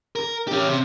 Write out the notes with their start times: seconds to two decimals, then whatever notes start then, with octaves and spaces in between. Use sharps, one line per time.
0.16 A#4
0.48 C#4 G4
0.68 C3